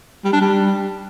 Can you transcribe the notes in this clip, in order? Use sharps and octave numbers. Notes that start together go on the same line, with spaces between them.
G3
D4
G3